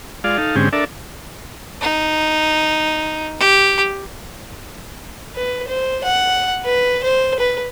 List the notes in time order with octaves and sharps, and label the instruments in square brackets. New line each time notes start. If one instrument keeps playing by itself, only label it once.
[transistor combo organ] G#3 F4 D5 F5
D#4 A4 F5
G#2 D3 G#3 C4 C#4 G4
D4 A4 A#4 D5 E5
[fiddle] D#4
G4
B4
C5
F#5
B4
C5
B4